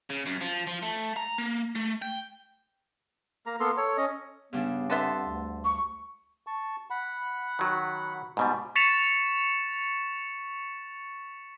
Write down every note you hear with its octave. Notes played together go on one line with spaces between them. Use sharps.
C#3
F#2
F3
F3
A3
A#5
A#3
A3
G5
A#3 A#5
A#3 B3 A4 C6
A4 C#5
C#4 D#5
G2 C#3 B3 D4
D3 B3 C4 C5 E5 A5
D2
C#6
A5 C#6
F#5 B5
D#3 F#3
G#2 B2 G3
C#6 A6 B6 C#7 E7 F7